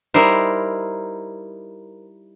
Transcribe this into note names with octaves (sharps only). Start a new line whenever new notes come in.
G3 D#4 E4 A#4 C5